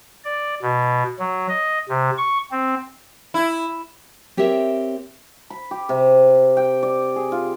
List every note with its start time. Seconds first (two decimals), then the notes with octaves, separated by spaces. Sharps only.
0.24 D5
0.62 B2
1.19 F#3
1.49 D#5
1.89 C3
2.18 C#6
2.51 C4
3.34 E4
4.37 C4 G4 A#4 C#5 E5
5.50 B5
5.71 G4
5.89 C3
6.57 G5
6.83 D5
7.16 G#4
7.32 F4